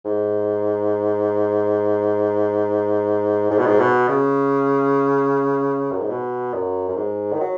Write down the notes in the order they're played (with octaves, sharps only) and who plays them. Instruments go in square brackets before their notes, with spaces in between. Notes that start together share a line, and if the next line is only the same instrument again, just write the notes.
[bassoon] G#2
G#2
B2
G#2
B2
C#3
F#2
G#2
B2
F#2
F#2
G#2
D#3
F#3